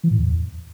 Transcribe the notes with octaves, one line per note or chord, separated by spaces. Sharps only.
E3
A2
E2